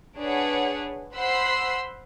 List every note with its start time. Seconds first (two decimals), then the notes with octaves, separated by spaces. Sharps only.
0.17 D4 G#4 B4 C#5 F#5
1.14 C5 F#5 B5 C6 E6 C7